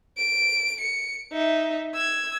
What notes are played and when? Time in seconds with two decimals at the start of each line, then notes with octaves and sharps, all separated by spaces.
0.17 D7
0.81 C#7
1.32 D#4 E5
1.95 E6 G#6